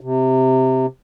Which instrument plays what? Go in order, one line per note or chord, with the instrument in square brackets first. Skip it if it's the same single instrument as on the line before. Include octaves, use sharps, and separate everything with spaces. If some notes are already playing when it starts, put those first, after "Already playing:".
[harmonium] C3